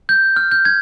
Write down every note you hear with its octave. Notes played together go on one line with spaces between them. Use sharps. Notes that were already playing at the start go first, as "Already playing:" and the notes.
G6
F6
G6
G#6